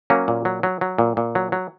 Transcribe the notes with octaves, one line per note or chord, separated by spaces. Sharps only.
F#3 A#3 C#4
A#2
F#3
F#3
F#3
A#2
A#2
F#3
F#3